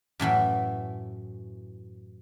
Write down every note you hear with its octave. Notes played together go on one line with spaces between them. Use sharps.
F#2 A2 E3 B5